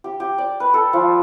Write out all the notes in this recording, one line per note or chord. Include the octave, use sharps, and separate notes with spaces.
G4
G4
D5
B4
A4
F3